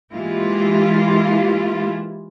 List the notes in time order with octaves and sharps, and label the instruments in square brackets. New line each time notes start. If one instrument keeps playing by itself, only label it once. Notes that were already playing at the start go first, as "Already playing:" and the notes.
[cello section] E3 G#3 A#3 E4 F4 G4